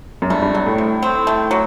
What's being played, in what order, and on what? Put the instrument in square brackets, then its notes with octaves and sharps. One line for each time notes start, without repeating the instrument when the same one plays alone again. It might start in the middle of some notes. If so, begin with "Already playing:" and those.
[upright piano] F#2
[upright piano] G2 [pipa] A3
[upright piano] G2
[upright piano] G2 [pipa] F#3
[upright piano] A2
[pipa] C3
C4
A3
F#3